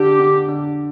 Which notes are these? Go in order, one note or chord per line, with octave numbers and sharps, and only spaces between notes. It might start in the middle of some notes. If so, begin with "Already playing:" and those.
Already playing: D3 G4
D3
D3